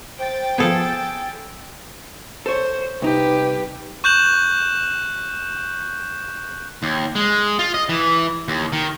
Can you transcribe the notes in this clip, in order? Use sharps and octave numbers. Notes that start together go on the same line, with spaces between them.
C5 G5 A6
F3 B3 G#4 A4
A4 C5 C#5
C2 D#4 G4 B4
C#6 F#6 G6 E7 F#7
D#2
G#3
F4
D#5
E3
D#2
D#3